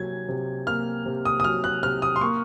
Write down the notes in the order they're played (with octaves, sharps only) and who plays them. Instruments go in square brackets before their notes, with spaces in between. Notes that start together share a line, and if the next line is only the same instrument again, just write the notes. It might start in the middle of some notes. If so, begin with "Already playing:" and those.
Already playing: [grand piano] C3 F#3 A#3 G#6
C3
A#3 F6
C3
D#6
D#6
F#3 F6
F#6
C3 F6
D#6
C6
A#3 C#6